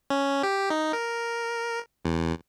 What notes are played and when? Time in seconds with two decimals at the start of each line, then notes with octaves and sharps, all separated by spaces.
0.10 C#4
0.43 G4
0.70 D#4
0.93 A#4
2.05 E2